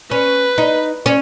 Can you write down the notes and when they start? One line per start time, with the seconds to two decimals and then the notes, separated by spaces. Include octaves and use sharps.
0.11 C#4 B4
0.58 D#4
1.06 C#4